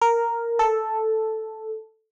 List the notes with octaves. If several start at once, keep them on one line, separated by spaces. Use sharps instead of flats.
A#4
A4